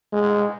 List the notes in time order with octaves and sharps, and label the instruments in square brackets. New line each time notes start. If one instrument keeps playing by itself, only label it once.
[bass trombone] G#3